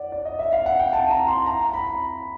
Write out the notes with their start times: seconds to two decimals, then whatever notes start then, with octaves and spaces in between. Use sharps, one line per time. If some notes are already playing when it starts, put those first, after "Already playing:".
Already playing: D5 F#5
0.12 D5
0.25 D#5
0.39 E5
0.53 F5
0.66 F#5
0.79 G5
0.93 A5
1.10 A#5
1.28 C6
1.46 A#5
1.73 B5